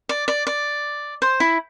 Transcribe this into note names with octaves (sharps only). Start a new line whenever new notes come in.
D5
D5
D5
C5
E4